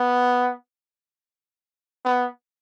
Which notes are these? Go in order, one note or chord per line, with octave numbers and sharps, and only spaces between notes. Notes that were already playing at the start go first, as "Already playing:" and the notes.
Already playing: B3
B3